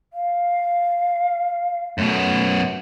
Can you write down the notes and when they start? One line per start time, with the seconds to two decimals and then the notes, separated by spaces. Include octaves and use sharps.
0.13 F5
1.98 F#2 B2 A3